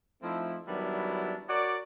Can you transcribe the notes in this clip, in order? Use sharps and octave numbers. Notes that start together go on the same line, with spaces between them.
F3 A3 C4 D#4 E4
D#3 F#3 G3 B3 D4 E4
F#4 A#4 C#5 D5